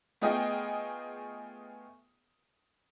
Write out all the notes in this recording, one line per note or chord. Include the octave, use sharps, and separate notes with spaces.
A3 B3 F4 G#4 D#5 G5